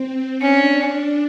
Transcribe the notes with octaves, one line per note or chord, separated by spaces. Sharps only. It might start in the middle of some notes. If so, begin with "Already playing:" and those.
Already playing: C4
C#4 D4